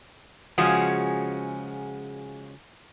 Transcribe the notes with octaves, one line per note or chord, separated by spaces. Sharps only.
C#3 F3 G#3 C#4 F#4